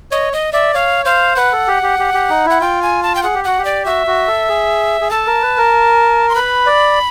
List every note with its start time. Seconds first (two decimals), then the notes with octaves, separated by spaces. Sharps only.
0.11 C#5 D#5
0.33 D#5
0.53 D5 E5
0.74 C#5 F5
1.05 C5 F5
1.36 B4 F#5
1.52 A4
1.67 G4
1.83 G4
1.99 G4
2.14 G4
2.29 D#4
2.46 E4 F#5
2.61 F4 G5
2.82 G#5
3.03 A5
3.15 G5
3.23 G#4 F#5
3.34 G4
3.44 F#4 F#5
3.58 G4
3.65 D5
3.85 F#4 E5
4.07 F#4
4.27 A4
4.49 G#4
5.01 G#4
5.11 A4 A5
5.26 A#4
5.42 B4
5.57 A#4
6.29 C6
6.35 B4 B5
6.66 D5